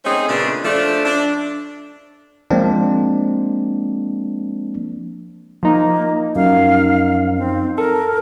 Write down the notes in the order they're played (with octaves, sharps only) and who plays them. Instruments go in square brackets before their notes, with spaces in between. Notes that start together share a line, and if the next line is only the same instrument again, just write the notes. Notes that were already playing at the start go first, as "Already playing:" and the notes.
[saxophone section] A3 C4 C#4 D#4 G#4
A#2 C#3 G#3 A3 B3 D4
F3 A3 D4
D4
[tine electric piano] F3 G#3 A#3 C4 D4
[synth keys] F3 D#4 [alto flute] A#3
[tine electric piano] F#2 [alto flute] F5
[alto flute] C4
[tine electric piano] A4 [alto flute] A#4